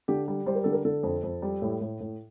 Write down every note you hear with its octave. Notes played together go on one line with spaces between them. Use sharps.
D3 G4
G3
G3 C5
A#4
D3 A4
A#4
D3 A4
F2
F2
G3
A2
A2
A2